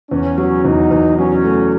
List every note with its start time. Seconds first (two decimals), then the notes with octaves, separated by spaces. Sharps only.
0.11 E2 C#4
0.38 F#3
0.65 E2 D#4
0.91 E2
1.18 F#3 C#4
1.44 A3